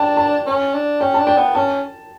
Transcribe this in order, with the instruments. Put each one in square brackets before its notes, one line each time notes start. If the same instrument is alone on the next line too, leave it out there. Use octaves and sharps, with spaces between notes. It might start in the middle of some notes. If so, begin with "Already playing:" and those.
Already playing: [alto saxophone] D4 [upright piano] G5 A5
[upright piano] A5
[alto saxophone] C#4
D4
[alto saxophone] C#4 [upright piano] G5
[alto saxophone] D4 [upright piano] A5
[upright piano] G5
[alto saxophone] B3
[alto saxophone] C#4 [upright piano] A5